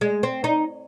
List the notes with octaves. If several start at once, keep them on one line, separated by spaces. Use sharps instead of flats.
G#3
C4
D#4